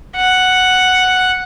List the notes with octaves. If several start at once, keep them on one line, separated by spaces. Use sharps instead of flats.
F#5